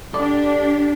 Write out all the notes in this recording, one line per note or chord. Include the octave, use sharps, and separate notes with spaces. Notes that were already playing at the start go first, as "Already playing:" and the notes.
D4 G4 A4 D5